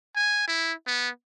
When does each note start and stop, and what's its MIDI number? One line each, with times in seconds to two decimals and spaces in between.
0.16 0.43 80
0.48 0.73 64
0.87 1.09 59